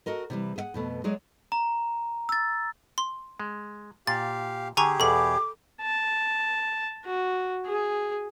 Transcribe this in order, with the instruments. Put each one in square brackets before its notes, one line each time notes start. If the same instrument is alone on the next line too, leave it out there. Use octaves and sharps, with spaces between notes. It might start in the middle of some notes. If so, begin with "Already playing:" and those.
[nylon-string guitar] F#4 A4 A#4 D#5
C3 E3 G3
G#4 E5 F#5
F2 B2 A3 B4
F#3 G#3 G#4 C#5 D5
[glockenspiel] A#5
E6 A6
[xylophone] C6
[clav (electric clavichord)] G#3
[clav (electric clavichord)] A#2 [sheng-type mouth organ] G4 F5 [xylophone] A6
[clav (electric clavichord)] D3 [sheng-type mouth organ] G4 G#4 [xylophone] G#5 A#5 C#6
[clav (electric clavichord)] E2 B2 [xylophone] A4 B5 [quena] D6
[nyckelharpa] A5
F#4
G#4